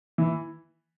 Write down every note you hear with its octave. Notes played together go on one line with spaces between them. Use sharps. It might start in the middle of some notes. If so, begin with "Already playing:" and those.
E3